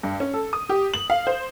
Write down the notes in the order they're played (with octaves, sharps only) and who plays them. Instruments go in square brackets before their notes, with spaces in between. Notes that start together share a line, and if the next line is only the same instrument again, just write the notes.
[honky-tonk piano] G2
C#4
A4
D#6
G4
F#7
F5
C5